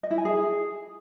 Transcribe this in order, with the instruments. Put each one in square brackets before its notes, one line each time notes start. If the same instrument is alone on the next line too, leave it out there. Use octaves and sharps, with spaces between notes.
[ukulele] D#5
E4
G#5
G#4